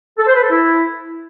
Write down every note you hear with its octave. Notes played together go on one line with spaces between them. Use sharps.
A4
C5
B4
A4
E4